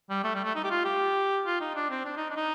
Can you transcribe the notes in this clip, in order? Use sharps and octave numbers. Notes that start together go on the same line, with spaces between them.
G3
A3
G3
A3
D#4
G4
F4
G4
F4
D#4
D4
C4
D4
D#4
D4
D#4